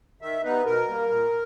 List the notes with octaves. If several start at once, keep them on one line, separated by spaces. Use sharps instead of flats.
D#3 E5
G3 B3 D#4 B4
B2 A#4
G3 A#3
A#2